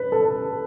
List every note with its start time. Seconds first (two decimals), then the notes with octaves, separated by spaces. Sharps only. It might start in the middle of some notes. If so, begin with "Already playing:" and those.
Already playing: B4
0.12 A4